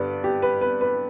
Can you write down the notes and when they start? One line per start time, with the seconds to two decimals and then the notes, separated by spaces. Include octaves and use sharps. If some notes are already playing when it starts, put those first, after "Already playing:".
Already playing: G2 D3 G3 B3 B4 D5
0.24 G4
0.42 B4
0.61 B4
0.81 B4